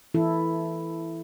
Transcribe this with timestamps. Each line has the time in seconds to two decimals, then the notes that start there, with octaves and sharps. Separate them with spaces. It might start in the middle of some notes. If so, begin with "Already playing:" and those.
0.14 E3 E4 A4